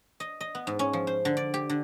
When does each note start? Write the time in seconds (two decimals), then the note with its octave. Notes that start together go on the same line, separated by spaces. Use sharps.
0.20 D#5
0.41 D#5
0.55 B3
0.67 G#2
0.79 C#4
0.93 F3
1.07 C5
1.25 D3
1.37 D5
1.54 G4
1.70 D3